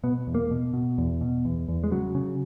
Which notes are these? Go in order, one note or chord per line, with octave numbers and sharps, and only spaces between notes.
B2 B3
E2
A#3
B2
B2
E2
B2
E2
E2
G#3
C#3 F#3
C#3